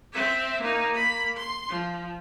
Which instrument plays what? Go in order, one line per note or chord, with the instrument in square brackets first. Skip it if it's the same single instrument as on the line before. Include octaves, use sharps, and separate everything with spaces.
[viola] C4 E5
A#3 D#4
A#3 B5
C6
F3